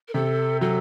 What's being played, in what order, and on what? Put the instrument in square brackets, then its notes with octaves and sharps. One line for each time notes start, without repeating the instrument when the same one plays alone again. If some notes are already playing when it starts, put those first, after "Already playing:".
[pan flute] A#4
[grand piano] C3 [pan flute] A4
[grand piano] F#3 [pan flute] A4